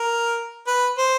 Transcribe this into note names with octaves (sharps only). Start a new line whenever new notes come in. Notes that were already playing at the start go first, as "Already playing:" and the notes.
Already playing: A#4
B4
C5